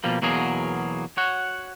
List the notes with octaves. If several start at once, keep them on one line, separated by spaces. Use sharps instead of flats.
B2 F3 G3 A#3
E2 B2 F#3 A#3 G#4
F#4 C#5 F#5